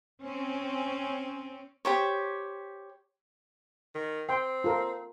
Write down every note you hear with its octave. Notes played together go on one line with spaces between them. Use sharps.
C4 C#4
G4 C5 C#5
D#3
C4 G5 C6
F4 A4 A#4